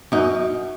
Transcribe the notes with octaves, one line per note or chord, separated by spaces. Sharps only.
F#2 D#4